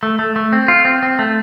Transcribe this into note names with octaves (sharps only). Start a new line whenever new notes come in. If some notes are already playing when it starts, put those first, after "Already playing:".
A3
A3
A3
C4
F4
C4
C4
A3